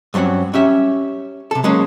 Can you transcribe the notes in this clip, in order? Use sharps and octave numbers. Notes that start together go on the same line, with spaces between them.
G2 F#3 C4 C#4 F#5
C#4 G4 E5
C3 A4
F#3 G#3 A#3 C#4